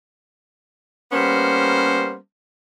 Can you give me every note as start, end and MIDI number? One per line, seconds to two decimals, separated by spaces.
1.12 2.15 55
1.12 2.15 58
1.12 2.15 59
1.12 2.15 61
1.12 2.15 70
1.12 2.15 72